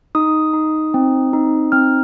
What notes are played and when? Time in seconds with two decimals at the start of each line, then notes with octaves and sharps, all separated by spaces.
0.15 D#4 D#6
0.53 D#4
0.94 C4
1.33 D#4
1.72 C4 F6